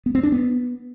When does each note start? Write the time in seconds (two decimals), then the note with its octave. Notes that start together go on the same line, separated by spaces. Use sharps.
0.06 B3
0.15 C4
0.23 D4
0.32 B3